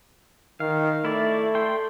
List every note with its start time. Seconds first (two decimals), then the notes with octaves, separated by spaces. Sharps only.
0.60 D#3 F5
1.05 A3 E4 D5
1.55 G5 C6